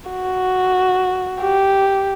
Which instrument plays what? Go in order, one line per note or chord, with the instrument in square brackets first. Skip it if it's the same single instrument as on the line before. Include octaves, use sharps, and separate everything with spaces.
[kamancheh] F#4
G4